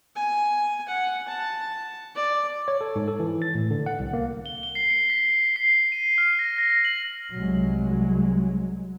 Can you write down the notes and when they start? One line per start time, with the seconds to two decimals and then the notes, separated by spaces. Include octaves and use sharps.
0.16 G#5
0.88 F#5
1.28 A5
2.15 D5
2.68 C#5
2.81 A4
2.96 G#2
3.08 A4
3.20 E3
3.42 A6
3.55 A2
3.71 D3
3.86 F#5
3.99 C2
4.13 A#3
4.46 G7
4.63 G7
4.75 C7
4.90 C#7
5.10 B6
5.56 C7
5.92 D#7
6.18 F6
6.39 A#6
6.58 A#6
6.70 A#6
6.85 F#7
7.35 C2 F#3 G#3